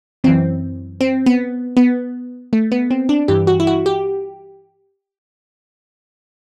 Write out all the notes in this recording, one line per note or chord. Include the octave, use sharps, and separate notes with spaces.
F#2 E3 C4
C4
B3
B3
A3
B3
C4
D4
G2 E3 G4
F#4
E4
F#4
G4